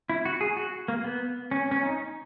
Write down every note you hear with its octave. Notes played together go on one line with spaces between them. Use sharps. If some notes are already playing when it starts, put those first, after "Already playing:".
E4
F#4
G#4
F#4
A#3
B3
C#4
C#4
D#4